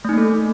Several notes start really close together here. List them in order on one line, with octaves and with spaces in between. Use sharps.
A3 D#4 A#3 A4